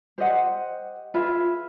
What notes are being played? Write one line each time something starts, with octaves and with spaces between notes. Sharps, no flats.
G4 C5 D#5 F#5
F4 G#4 B4 E5